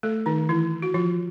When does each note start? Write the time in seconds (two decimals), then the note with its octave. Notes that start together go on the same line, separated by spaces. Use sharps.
0.03 A3 A4
0.26 D#3 D#4
0.49 E3 E4
0.82 F#4
0.94 F3 F4